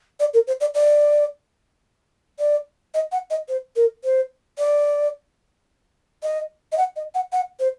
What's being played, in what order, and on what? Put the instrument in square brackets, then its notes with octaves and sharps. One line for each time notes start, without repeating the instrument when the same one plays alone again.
[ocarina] D5
A#4
C5
D5
D5
D5
D#5
F#5
D#5
C5
A#4
C5
D5
D#5
D#5
F#5
D#5
F#5
F#5
C5